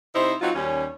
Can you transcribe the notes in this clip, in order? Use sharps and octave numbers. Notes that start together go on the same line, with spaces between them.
C3 D#4 E4 C5
F#3 C4 D#4 F4 F#4
D#2 G3 C#4